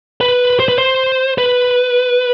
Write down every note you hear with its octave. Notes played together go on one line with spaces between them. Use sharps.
B4
C5
B4
C5
B4